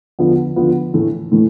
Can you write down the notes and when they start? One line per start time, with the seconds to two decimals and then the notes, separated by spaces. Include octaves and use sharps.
0.19 D3 F3 B3 F4
0.56 D3 F3 B3 F4
0.94 A2 E3 A3
1.32 A2 E3 A3